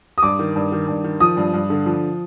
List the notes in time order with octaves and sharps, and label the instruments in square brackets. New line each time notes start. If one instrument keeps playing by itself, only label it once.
[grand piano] D#6
G2 D6
D#3
G2
D#3
G2
D#3
F3 D#6
G2
G2
D3
F3